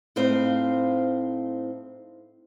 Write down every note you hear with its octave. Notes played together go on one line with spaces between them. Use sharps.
A2 C4 D#4 C5 F5